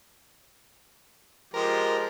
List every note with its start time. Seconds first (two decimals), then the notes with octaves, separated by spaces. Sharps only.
1.54 F3 G#3 G4 A#4